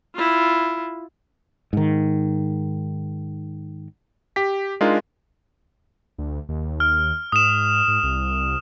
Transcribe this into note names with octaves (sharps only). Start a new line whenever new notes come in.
E4 F4
G#2 D#3
G4 B6
G#3 D4 D#4 F4 A#4
D2
D#2
F6
G#2 D#6 E7
G#2
C2